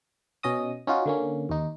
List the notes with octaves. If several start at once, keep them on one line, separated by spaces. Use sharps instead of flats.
B2 C#4 D#5 D#6
C#4 D#4 F4 F#4
D3 A#3 C#4
D#2 D#4